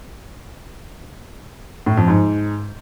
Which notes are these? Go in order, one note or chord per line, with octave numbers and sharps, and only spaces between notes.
A2
F2
G#2